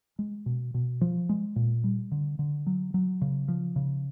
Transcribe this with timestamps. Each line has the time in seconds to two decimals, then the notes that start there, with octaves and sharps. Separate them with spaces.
0.19 G#3
0.46 B2
0.74 B2
1.01 F3
1.29 G#3
1.56 A#2
1.84 G3
2.12 D3
2.39 D3
2.66 F#3
2.94 F#3
3.21 C#3
3.48 F3
3.76 C#3